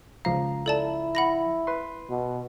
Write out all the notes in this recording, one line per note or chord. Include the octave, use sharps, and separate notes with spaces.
C#2 F3 F5 A#5
E4 A4 D5 A5
F#5 B5 A#6
B4 C6
B2